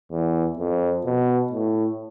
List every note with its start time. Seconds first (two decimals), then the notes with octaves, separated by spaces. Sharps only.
0.11 E2
0.58 F2
1.05 B2
1.53 A2